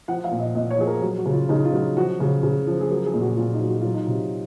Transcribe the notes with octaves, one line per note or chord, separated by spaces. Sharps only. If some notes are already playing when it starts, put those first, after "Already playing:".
F3 F#5
F5
A#2
D#5
A#2 D#5
C#5
F3 G#4
A#4
F#3
F#4
C#3
F4
C#3 D#4
F4
F#3
F3 F#4
C#3
C#3
F3
G#4
F#3 A#4
G#4
A#2
F#4
A#2 F4
D#4
F#3
F#4
F#3 F4
D#4
C3 F4